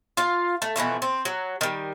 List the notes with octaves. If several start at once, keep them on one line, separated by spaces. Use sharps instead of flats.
F4 F5
A3
B2 E3 F3 A3
C4
F#3
D#3 G3